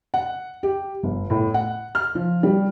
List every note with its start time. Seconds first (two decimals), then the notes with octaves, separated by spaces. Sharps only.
0.14 F#5
0.63 G4
1.03 G1
1.30 A2
1.54 F#5
1.95 F6
2.15 F3
2.43 G3